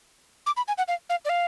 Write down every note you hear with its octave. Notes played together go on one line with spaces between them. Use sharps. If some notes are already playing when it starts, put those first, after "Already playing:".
D6
B5
G#5
F#5
F5
F5
D5
F5